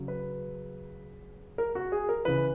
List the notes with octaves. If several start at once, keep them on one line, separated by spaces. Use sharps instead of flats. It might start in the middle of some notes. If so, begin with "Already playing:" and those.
Already playing: C#3 F#3
B4
A#4
F#4
G#4
A#4
C#3 E3 B4